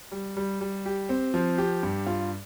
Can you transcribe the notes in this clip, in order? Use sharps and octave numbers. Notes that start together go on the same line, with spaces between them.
G3
G3
G3
G4
C4
F3
G4
G2
F4